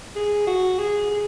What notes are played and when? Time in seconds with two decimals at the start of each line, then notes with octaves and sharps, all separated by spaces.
0.15 G#4
0.47 F#4
0.79 G#4
1.11 G#4